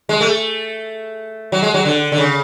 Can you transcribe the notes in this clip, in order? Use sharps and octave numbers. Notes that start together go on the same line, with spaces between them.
G#3
A3
F#3
G#3
F#3
D3
D3
C#3